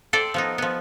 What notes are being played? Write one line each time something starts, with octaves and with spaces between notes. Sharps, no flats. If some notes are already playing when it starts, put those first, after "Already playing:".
A4 C5 D5 G5
F3 B3 D#4
F3 B3